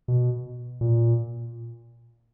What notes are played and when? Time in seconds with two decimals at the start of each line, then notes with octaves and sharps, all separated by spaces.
0.08 B2
0.81 A#2